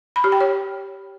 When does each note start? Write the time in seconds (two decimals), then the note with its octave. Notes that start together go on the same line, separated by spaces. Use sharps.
0.16 B5
0.24 G4
0.32 G5
0.41 C#5